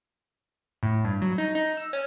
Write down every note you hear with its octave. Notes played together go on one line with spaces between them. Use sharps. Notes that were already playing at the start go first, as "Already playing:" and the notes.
A2
G2
F#3
D#4
D#4
E6
C#4